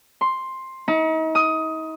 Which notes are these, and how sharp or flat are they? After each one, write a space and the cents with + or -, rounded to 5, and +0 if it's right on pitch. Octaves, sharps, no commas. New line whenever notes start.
C6 +5
D#4 +40
D#6 +15